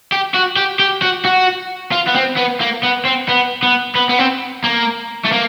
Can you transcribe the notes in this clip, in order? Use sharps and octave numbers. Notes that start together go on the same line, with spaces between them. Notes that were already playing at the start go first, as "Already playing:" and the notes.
G4
F#4
G4
G4
F#4
F#4
F4
B3
C4
B3
A#3
B3
C4
B3
B3
B3
B3
C4
A#3
A3
A#3